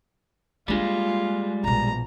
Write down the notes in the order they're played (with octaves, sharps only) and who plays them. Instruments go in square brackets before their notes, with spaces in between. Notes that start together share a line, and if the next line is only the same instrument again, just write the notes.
[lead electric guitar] G3 G#3 [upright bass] A#3 D4 [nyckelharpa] F4
[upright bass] A#1 B2 [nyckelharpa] A#5